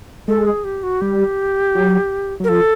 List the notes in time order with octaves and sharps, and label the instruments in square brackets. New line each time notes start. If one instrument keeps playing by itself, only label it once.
[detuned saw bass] G#3 [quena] A4
[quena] G#4
G4
F#4
[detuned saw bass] G3 [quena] G4
[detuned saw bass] F#3
[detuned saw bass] F#3 [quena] A#4
[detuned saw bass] F3 [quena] A4